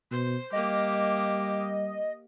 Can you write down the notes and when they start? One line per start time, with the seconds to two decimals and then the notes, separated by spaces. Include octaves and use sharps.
0.11 B2 C5
0.53 G3 A#3 G4 D#5